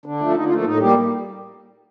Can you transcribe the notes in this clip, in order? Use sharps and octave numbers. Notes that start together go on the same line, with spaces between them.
D3 D4
F3 A3
D3 D#4
F4
F3 A3 A#3
A2 D#4
G3 A#3 G4